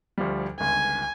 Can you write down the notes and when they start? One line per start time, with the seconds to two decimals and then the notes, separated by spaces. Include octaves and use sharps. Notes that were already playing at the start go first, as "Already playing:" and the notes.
0.18 D2 F3 G3
0.60 G1 C#2 G#5